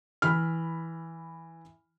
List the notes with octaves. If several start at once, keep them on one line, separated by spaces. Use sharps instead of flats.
E3 B5 F6